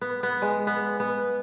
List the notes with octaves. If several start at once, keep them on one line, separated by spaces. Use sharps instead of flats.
B3
B3
G#3
B3
B3